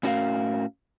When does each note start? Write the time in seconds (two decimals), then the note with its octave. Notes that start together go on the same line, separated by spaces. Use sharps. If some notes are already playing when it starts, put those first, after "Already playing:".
0.03 A2 C#4 F#4 G#4 A#4 F5